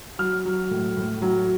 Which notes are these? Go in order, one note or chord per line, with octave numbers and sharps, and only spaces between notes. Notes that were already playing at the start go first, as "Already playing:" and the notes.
F#3 F6
F#3
A2
A2
F#3